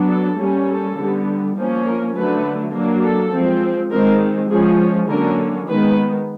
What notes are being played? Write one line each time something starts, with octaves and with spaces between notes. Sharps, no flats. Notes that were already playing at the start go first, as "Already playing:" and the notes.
Already playing: F#3 B3 D4
A4
G3 A#3 C#4
A4
D3 G3 B3
F3 A#3 C#4
A#4
D3 F#3 A3 B4
F#3 A#3 D4
A4
F3 G#3 C4
D#3 G#3 C4 A#4
F3 G#3 C#4 G#4
D3 F#3 A#3 C#4 A#4
D#3 G#3 B3 B4